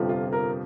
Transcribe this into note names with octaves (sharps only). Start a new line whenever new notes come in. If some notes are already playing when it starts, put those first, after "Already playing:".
Already playing: G1 F2 C3 F3
F4
A#4